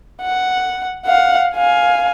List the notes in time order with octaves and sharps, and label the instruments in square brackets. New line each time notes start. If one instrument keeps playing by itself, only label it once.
[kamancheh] F#5
F5 F#5
F5 G#5